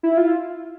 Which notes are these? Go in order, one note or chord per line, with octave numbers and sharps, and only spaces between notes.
E4
F4